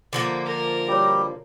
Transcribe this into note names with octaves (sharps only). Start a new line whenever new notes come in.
D3 F3 A#3
A#4
G3 F#4 G4 C#5